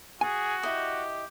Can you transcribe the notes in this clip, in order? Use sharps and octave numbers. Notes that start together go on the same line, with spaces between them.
F#4 G#4 G#5
E4 G4 D#5